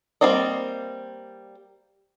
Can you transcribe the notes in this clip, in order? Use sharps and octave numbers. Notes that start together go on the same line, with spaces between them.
G3 A#3 C4 D5 D#5